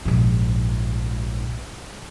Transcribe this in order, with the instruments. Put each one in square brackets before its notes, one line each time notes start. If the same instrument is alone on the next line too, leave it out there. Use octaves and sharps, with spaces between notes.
[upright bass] A#1 G#2